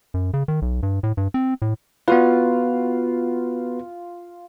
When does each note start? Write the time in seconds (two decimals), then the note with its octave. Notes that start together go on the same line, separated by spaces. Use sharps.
0.14 F#2
0.34 C#3
0.48 D#3
0.62 B1
0.83 G2
1.03 A2
1.17 G2
1.34 C4
1.62 A2
2.08 B3 F4 F#4 B4